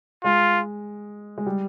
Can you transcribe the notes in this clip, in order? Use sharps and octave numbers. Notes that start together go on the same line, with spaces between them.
G#3 F4
G#3
G3